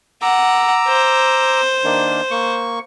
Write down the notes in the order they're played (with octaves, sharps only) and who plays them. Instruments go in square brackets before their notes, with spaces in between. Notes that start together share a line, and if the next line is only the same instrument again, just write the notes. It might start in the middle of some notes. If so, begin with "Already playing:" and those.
[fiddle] F#5 [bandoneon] A#5 D6 E6
[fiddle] C5
[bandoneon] D#3 A#3 D4
A#3 C#6